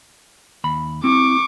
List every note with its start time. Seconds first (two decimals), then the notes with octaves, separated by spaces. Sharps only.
0.64 D#2 B5
1.04 C4 E4 C#6 D6